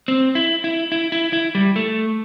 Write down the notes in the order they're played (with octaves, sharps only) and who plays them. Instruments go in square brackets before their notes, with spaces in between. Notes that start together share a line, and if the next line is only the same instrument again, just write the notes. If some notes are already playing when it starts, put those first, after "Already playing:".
[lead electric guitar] C4
E4
E4
E4
E4
E4
G3
A3